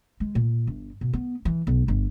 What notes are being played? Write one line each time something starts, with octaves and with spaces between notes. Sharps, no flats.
G#3
A#2
G1
B2
B3
E3
B1
G1